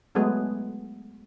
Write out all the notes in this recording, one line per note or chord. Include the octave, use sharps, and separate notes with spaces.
F#3 G#3 A3 B3 G#4